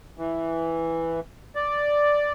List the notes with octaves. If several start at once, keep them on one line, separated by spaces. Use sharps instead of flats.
E3
D5